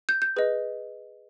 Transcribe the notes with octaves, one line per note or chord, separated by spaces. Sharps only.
G6
G6
G#4 B4 D#5